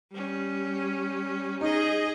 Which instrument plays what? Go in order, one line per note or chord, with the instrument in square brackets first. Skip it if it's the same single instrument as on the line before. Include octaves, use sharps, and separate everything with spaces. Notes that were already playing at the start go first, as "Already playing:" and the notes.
[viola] G3 C#4
[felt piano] D#4 [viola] G#4 D#5